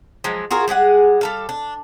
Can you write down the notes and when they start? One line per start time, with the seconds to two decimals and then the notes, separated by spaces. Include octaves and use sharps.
0.24 F3 F#3 G#3
0.51 F4 F#4 G#4 A#4
0.68 G3 G#3 G#4 F#5
1.21 G3 A4 F5
1.49 D4